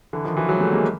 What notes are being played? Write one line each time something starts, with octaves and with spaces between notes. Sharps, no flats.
D3 E3
D#3 F3
E3 F#3
F#3 G#3
G3 A3
G#3 A#3